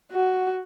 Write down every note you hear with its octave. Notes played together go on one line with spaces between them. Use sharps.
F#4